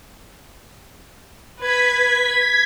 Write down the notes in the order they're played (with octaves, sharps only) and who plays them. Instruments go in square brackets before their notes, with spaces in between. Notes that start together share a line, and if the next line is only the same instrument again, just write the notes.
[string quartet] B4 [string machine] G#6 B6